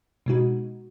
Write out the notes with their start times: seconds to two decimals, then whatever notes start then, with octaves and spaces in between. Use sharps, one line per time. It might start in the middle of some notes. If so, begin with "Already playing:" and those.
0.26 B2 G#3 D#4 F#4